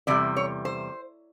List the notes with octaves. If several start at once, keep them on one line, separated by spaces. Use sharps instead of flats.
E2 C3 G3 D5
C#5
C5